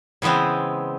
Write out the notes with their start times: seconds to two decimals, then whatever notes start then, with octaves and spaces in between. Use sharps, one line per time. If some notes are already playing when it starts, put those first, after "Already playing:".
0.22 C#3 E3 G#3 B3 C4